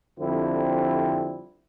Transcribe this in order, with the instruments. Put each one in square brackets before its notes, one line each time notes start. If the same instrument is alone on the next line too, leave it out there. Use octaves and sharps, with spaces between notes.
[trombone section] F2 D3 G3 C4 E4